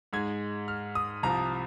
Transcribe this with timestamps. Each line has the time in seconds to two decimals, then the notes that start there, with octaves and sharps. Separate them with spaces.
0.13 G#2 G#3 G#6
0.68 F6
0.95 D#6
1.23 C2 C3 F3 A#5